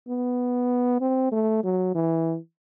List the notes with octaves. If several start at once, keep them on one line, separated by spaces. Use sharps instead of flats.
B3
C4
A3
F#3
E3